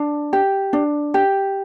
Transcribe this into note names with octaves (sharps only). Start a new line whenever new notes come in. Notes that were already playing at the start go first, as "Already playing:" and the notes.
Already playing: D4
G4
D4
G4